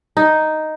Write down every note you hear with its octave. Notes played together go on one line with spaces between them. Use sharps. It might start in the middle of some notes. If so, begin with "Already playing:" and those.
D#4